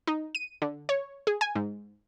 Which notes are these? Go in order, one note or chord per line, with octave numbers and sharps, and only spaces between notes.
D#4
D#7
D3
C#5
G#4
G#5
G#2